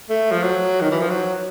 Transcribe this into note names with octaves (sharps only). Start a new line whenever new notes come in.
A3
F3
F#3
D#3
E3
F3
F#3